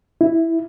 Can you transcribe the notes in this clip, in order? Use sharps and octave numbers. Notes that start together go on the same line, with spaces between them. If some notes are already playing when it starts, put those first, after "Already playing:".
E4